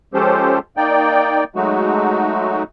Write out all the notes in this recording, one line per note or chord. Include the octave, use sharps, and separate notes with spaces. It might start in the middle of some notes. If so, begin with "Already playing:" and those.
F3 G#3 C#4 G4 A4 C5
A#3 D#4 D5 G5
F#3 G#3 A3 D#4 F#4